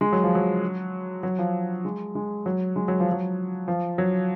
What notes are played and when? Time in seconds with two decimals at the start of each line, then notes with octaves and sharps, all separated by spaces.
0.01 G#3
0.12 F#3
0.23 F3
0.35 F#3
1.23 F#3
1.39 F3
1.85 G#3
2.15 G#3
2.46 F#3
2.76 G#3
2.88 F#3
3.00 F3
3.12 F#3
3.68 F3
3.98 F#3